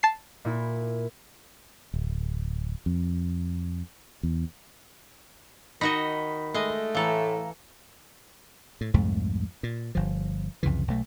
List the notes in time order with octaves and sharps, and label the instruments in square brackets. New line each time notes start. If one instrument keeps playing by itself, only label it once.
[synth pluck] A5 C7
[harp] A#2 E4
[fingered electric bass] D1
F2
E2
[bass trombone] D#3 [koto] D#4 F#4 D#5 [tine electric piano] B5 B6
[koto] G#3 D#5 [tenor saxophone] A3
[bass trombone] A2 [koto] E3 A4 [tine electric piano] F5 A#5
[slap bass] A2
C2 F2 G#2 A3
A#2
G1 F3
C2 F2 C#3 E3
B1 A3